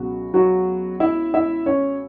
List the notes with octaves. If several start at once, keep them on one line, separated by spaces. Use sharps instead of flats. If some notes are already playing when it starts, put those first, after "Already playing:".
Already playing: C#2 B2 F#3 F#4
F#3 F#4
E4 E5
E4 E5
C#4 C#5